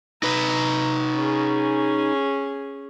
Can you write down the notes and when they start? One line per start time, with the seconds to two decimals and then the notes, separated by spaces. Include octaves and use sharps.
0.23 D#4 B4 A#5
1.15 C#4 G#4